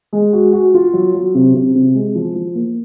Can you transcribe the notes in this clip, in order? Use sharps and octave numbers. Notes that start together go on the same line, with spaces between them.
G#3
F#4
F#4
F4
F#3
F#3
C3
C3
C3
G#3
F3
F3
A#3